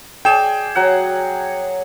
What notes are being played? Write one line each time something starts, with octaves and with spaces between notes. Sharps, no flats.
G#4 D5 G5 G#5 E7
F#3 F#5